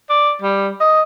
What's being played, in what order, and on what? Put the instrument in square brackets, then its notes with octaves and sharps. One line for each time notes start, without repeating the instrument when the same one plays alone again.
[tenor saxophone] D5
G3
D#5